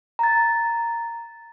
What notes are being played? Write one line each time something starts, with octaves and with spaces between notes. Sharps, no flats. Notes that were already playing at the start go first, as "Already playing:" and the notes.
A#5 A6